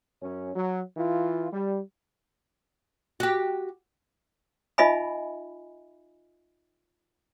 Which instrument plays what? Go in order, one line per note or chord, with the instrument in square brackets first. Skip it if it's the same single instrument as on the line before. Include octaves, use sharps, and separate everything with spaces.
[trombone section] F#2 C#4
F#3
E3 F4
G3
[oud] F#4 G4
[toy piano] D#4 F4 D#5 E5 G#5 B5